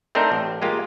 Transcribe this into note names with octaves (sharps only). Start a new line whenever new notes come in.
A3 C4 D4 D#4 A#4 C5
A1
G#3 A#3 F4 G4